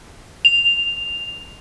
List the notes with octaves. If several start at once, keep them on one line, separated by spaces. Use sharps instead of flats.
F7